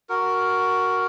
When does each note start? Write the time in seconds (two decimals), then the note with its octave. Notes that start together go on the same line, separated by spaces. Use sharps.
0.09 F#4 A#4